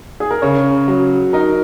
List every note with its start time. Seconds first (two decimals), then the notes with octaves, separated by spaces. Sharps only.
0.20 G#4
0.31 A#4
0.42 C#3 C#5
0.88 F#3
1.33 D#4 A#4